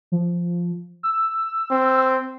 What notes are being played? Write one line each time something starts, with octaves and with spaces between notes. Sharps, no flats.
F3
E6
C4